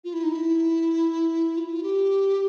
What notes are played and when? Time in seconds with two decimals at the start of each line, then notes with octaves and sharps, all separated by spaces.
0.04 F4
0.14 E4
0.24 D#4
0.32 E4
1.57 F4
1.66 E4
1.73 F4
1.83 G4